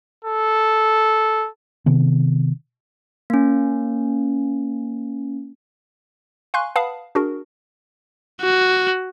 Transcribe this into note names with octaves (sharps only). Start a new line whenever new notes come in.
A4
C3 D#3 B3
A#3 C#4
F5 G#5 C6 C#6 F#6
B4 F5 F#5 A5 B5 D#6
D4 F#4 G#4 A#4
F#4